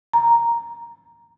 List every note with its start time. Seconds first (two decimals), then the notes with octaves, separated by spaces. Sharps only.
0.14 A#5